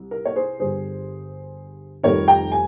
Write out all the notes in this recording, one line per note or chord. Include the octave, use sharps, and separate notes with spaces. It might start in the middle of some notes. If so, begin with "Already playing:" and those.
Already playing: C2
A#4
C#5
G#4 C5
G1 G2 G3 G#4 C5
F1 F2 D#3 G3 A#4 C#5
G5 A#5
G#5